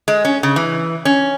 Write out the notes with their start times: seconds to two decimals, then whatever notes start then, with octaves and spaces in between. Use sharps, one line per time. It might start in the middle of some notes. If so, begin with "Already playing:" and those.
0.08 G#3
0.25 C#4
0.43 C#3
0.56 E3
1.05 C#4